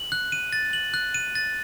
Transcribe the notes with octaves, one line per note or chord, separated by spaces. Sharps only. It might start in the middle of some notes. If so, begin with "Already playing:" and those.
Already playing: F#7
F#6
D#7
A6
F#7
F#6
D#7
A6